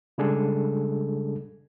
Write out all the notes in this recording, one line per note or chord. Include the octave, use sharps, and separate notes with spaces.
C#3 G3 G#3 D4 G#4 A4